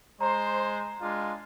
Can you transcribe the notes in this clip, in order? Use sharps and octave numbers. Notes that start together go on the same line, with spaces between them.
G#3 C5 A#5
G#3 D4 F4